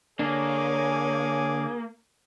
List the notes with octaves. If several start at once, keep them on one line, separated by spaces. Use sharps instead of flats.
D3 A#3 D4 G#4 C#5 G#5 D6